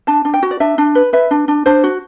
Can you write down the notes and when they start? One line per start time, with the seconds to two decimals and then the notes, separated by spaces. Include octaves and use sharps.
0.07 D4 A5
0.25 D4
0.34 G5
0.43 F#4
0.51 D5
0.60 D4 E5
0.78 D4
0.95 B4
1.13 B4 E5
1.31 D4
1.48 D4
1.66 D4 C5
1.84 F#4